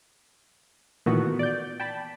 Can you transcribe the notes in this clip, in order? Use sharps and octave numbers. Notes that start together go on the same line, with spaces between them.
A#2 D#3 E3 A3 B3 F#4
D5 G6
G5 A5 B5